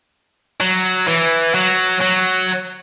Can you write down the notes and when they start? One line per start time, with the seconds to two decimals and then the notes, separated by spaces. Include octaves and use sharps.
0.61 F#3
1.07 E3
1.54 F#3
2.00 F#3